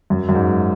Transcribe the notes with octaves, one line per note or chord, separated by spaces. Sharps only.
F#2
F#2
G#2